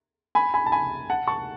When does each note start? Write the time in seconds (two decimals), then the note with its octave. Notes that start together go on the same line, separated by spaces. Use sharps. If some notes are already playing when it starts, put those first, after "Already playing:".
0.35 G#5 B5
0.54 G#5 B5
0.66 A5
0.72 G#5 B5
1.10 F#5 A5
1.27 A5 C#6